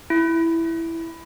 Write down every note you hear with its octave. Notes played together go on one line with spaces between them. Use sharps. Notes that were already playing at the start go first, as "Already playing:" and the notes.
E4